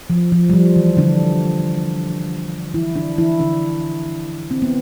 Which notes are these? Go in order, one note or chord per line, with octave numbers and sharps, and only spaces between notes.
F3
F3
G3
F3
E3
D3 D4
E3 E4
D3 D4
E3 E4
D3 D4
C4
B3